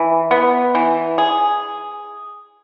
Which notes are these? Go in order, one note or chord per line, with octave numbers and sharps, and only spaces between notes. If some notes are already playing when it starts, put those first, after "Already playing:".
Already playing: E3
B3
E3
G#4